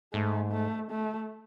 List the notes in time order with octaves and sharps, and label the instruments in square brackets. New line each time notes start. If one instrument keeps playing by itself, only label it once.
[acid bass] G#2 [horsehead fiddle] A3
[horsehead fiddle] A3
A3